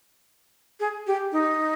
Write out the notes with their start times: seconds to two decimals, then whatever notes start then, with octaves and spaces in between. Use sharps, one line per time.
0.80 G#4
1.07 G4
1.32 D#4